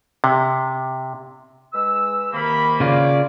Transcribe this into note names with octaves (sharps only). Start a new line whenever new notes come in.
C3
G#3 B4 E6
C3 D#3 A#3 B5
C#3 F4 C#5 D5